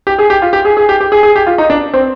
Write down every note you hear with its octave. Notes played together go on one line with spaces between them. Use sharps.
G4
G#4
G4
F4
G4
G#4
G#4
G4
G4
G#4
G#4
G4
F4
D#4
D4
C4